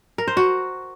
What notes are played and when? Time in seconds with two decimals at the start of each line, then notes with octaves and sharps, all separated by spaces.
0.18 A#4
0.28 C5
0.37 F#4